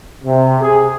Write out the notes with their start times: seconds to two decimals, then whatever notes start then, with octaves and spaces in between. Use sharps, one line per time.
0.24 C3
0.61 G#4